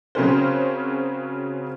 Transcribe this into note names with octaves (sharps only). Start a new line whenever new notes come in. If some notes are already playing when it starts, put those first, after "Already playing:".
C#3 F#3 C4 C#4 A#4 C5